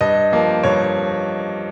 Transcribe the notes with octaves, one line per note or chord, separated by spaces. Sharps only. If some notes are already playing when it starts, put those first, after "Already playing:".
G2 D#5
F3 A#3
G2 C#5